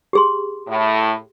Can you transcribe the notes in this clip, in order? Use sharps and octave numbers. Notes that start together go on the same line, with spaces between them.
G4 G#4 C6
A2